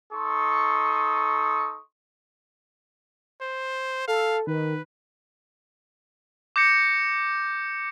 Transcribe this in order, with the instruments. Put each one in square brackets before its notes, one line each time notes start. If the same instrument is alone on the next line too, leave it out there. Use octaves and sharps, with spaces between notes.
[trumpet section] D#4 A4 C6 C#6 D#6
[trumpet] C5
[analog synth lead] A4 [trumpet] F5
[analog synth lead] D#3 [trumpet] B4
[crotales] D6 G6 A#6 C#7